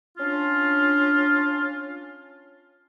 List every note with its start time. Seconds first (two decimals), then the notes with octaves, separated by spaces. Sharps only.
0.18 C#4 D4 F4